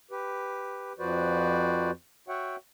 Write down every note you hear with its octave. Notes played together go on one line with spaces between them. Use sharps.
G4 B4
F2 F3 F#4 B4 C5 D5
F#4 C#5 E5 F#5 G5